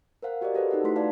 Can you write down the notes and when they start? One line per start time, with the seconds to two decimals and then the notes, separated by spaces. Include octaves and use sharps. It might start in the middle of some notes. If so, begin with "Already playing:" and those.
0.22 A#4 C5 F5 F#5
0.41 F#4 G4 A#4 D5 D#5
0.55 G4 A4 B4 C5
0.71 D#4 F#4 F#5
0.84 A3 E4 C6 B6
0.96 B4 D5 F5 A5